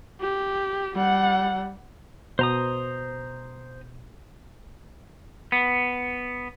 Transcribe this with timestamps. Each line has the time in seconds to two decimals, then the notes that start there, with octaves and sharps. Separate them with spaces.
0.21 G4
0.94 G3 F#5
2.39 B2 C5 A#5 D#6
5.52 B3